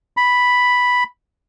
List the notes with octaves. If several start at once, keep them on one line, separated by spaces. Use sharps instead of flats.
B5